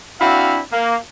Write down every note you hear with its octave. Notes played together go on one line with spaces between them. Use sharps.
C4 D4 E4 F#4 F5
A#3